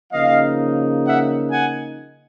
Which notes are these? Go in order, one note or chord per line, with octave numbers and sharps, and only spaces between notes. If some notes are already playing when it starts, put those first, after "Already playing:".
C#3 F3 A#3 D#4 D#5 F5
E5 F#5
F#5 G#5